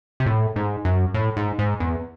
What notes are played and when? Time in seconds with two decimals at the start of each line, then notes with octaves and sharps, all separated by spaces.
0.20 C3
0.26 A2
0.56 G#2
0.85 F#2
1.14 A2
1.37 G#2
1.59 G#2
1.80 E2